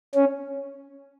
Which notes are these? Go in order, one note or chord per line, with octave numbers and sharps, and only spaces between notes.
C#4